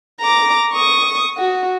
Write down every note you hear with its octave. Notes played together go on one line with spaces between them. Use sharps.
A#5 D6
C#6 D#6
F#4